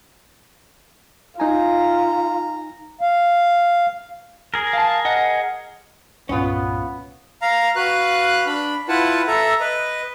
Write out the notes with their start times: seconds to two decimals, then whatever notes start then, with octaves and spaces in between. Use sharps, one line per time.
1.40 D#4 F4 G#5 A#5
3.01 F5
4.54 G#4 A#4
4.73 F5 A5
5.05 D#5 F#5
6.29 C2 G2 A#2 B3 C#4 F4
7.42 F5 A#5
7.76 F#4 B4 F5 F#6
8.46 D4 B5
8.88 E4 F4 B4 F#5 A5
9.27 A4 E5 A#5
9.60 B4 D#5